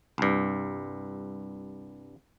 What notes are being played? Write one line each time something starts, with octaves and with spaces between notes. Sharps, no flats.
C2 G2